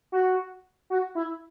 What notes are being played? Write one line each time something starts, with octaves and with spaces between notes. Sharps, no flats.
F#4
F#4
E4